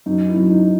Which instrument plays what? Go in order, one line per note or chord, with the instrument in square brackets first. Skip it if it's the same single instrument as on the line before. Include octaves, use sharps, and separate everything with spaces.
[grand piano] F#2 D#4
E4
F#2
D#4